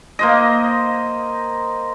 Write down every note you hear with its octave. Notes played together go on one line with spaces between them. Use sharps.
A#3 C5 D#5